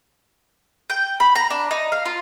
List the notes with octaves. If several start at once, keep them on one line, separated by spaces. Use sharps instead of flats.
G5
B5
A#5
D4
D#4
F5
F4